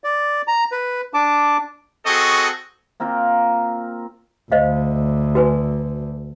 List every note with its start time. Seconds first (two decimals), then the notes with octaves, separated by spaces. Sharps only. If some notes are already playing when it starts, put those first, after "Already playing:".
0.04 D5
0.48 A#5
0.72 B4
1.14 D4 A5 D6
2.06 C4 F#4 G#4 A4 D#5 C#6
3.00 A#3 C4 F4 A#4
4.52 D2 C5 D#5 F5
5.35 F#4 B4 G#5